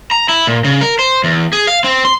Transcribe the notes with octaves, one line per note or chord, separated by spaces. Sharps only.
A#5
E4
A#2
C#3
A#4
C5
E2
G#4
F5
C4
C6